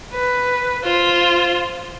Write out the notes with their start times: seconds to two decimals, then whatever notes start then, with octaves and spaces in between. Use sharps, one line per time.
0.12 B4
0.84 F4 C5